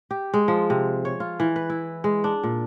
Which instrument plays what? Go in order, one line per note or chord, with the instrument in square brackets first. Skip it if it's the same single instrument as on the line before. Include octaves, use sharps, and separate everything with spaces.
[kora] G4
G#3
F3
C3
C#5
F4
E3
B4
E4
G#3
D4
A#2